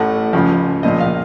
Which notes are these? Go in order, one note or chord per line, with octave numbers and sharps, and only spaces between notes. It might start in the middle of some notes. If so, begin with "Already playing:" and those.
Already playing: A1 A2 A3 F#5
C#2 C#3 F3
A#1 A#2 F3 D#5
F5